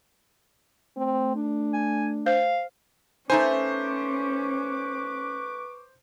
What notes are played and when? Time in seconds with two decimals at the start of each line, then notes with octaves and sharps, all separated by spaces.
0.97 A3 C4
1.35 D4
1.74 G#5
2.26 C5 F5
3.30 A3 C#4 D#4 B4 C5 G#5 C#6 D6